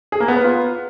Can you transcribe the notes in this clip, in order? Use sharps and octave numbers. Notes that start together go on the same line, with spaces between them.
G#4
A#3
B3
B4
F4